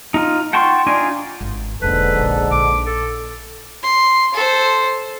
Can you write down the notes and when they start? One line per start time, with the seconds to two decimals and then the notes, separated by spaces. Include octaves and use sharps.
0.14 D#4 F4
0.53 F#5 G5 A5 C6 C#6
0.87 D4 D#4 F4 D5 G#5
1.41 G#1
1.82 E1 G#2 D3 A#3 A4 B4
2.16 A#1
2.51 A#1 D6
2.86 A4
3.83 C6
4.34 A4 C5